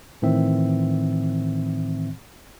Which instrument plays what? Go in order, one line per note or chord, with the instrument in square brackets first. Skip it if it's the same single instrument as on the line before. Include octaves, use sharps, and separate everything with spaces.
[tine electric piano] A2 D#3 E3 C4 E5